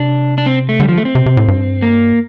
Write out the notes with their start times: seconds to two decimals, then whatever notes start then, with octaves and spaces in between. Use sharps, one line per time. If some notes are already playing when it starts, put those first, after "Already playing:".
Already playing: C3 D4
0.38 D4
0.46 C4
0.69 A3
0.80 D3 G3
0.89 F3
0.98 A3
1.05 C4
1.15 C3
1.26 C3
1.37 A2
1.48 G2
1.82 A#3